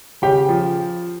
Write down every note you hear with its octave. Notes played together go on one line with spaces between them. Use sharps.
C#3 G4 G5
F3